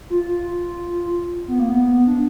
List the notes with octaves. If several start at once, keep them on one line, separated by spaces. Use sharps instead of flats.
F4
B3
A#3
B3
D4